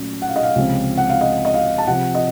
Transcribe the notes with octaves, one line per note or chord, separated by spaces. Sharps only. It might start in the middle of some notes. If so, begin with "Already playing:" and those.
Already playing: A#2 F#3 A3 C#4
F#5
F5
D#5
F5
C#2 C3 F3 C4
F#5
F5
D#5
D#5
F5
A5
C3 F3 C4 F#5
D#5